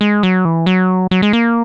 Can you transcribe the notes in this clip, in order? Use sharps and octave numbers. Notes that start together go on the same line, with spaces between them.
G#3
F#3
E3
F#3
F#3
G#3
A#3